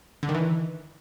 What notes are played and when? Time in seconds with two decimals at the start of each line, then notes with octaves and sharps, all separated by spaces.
0.23 D3
0.29 D#3
0.35 E3